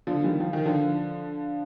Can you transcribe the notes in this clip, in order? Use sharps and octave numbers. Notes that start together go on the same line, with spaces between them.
D3 F3
D#3 G3
F3
D#3
D3 F3